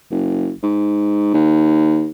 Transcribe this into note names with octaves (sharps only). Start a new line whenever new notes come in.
F#1
G#2
D#2